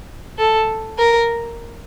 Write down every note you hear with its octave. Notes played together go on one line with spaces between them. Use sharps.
A4
A#4